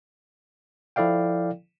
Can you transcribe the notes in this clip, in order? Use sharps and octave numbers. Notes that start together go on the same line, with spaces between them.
F3 E4 A4 D5 F5 G5